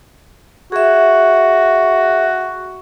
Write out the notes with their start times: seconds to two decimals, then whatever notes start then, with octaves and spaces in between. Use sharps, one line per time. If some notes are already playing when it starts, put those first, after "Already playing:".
0.72 F#4 G#4 E5